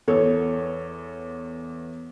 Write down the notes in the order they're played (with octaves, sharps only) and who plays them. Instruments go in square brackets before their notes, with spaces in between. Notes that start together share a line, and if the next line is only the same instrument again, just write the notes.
[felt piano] E2 B3 A4 C#5